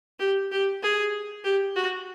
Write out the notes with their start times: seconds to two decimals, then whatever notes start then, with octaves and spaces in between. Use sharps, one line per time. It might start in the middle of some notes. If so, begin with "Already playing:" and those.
0.19 G4
0.51 G4
0.82 G#4
1.44 G4
1.76 F#4